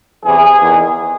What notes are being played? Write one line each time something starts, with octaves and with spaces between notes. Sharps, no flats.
E2 C3 E3 G#4
E2 D#3